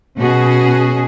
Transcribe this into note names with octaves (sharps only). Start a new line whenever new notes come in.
B2 C#4 F#4 G#4